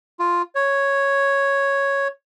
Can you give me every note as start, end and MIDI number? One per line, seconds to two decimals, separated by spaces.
0.19 0.42 65
0.55 2.08 73